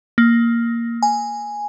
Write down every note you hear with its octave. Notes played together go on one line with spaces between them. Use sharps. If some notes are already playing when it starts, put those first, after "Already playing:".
A#3
G#5